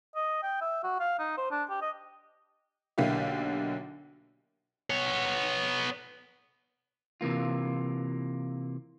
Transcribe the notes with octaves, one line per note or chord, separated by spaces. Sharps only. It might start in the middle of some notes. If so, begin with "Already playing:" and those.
D#5
G5
E5
F#4
F5
D#4
C5
D4
G4
D#5
B1 D3 A#3 E4 G4 F5
B3 C#5
C3 E3 A#3 F4